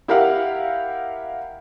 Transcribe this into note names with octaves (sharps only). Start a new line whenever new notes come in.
E4 G4 A#4 F5 F#5